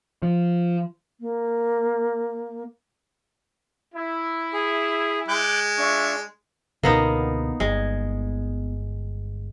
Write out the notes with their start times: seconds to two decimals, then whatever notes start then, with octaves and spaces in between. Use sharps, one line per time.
0.22 F3
1.20 A#3
3.95 E4
4.53 G#4
5.28 G#3 D6 F#6 G6
5.78 D4 F4 E5 C#6
6.83 C#2 B2 D3 A#3 B3 D#4
7.60 G1 G#3